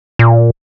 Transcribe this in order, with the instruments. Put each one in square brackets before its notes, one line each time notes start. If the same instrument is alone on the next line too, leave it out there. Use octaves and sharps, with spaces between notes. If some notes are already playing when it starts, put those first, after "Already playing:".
[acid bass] A#2